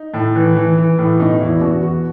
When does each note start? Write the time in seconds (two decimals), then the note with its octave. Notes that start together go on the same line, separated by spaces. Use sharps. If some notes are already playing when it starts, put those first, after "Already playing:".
Already playing: D#4
0.14 A2
0.35 E3
0.55 E3
0.77 E3
0.98 A2
1.19 B2 D#4
1.40 E2 E4
1.61 B2 F#4
1.83 E2 F#4